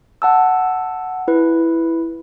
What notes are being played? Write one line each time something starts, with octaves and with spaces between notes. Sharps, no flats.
F#5 A5 E6
E4 B4